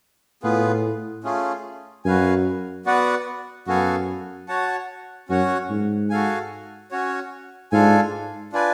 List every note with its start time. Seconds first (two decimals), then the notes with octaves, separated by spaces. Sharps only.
0.43 A2 B3 F4 G#4 B4
1.24 A3 C#4 F4 G#4
2.05 F#2 F#4 B4 F5 G#5
2.86 B3 F#4 B4 D5 F#5
3.67 F#2 B3 F#4 A4 F5 G#5
4.48 F#4 C#5 F#5 A5
5.29 F#2 C#4 F#4 C#5 F#5
5.70 G#2
6.10 F#4 A4 F5 G#5
6.91 C#4 F#4 C#5
7.72 G#2 D4 F4 A4 F5 G#5
8.53 D4 F4 B4 D5 G#5